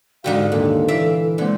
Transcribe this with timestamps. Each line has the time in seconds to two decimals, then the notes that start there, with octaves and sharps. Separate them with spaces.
0.24 G#2 D3 G#3 F#4 G4 F5
0.52 D#2 A#2 A4
0.88 E3 D5 E5 F5
1.38 D3 G#3 A#3 C4 A4